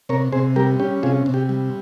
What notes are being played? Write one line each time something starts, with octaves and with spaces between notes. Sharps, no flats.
C3 A#4 C#5
C3 G#4 C5
G3 G4 A#4
C#4 G4
C3 F4 G#4
C3
G4
G3